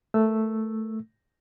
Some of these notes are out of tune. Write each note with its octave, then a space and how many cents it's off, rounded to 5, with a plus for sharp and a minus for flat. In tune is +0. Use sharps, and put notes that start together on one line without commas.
A3 +0 A#4 +0 E6 +0